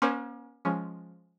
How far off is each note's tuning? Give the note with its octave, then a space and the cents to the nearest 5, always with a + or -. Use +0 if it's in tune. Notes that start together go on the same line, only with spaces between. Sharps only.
A#3 +45 C#4 +0 C5 +0
F3 +0 G#3 +0 C#4 +5